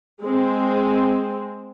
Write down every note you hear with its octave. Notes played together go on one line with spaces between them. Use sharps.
G#3 C4